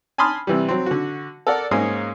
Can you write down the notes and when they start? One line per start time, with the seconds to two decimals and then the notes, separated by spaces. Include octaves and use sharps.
0.18 G#5 A5 B5 C6 D#6 F6
0.47 C3 E3 G3
0.69 F#3 C4
0.86 D3 F#4
1.47 A4 A#4 D5 F#5
1.71 G#2 G#3 A#3 C#4 C#5 D#6